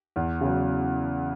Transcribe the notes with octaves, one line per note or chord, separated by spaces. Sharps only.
E2
C#3 F#3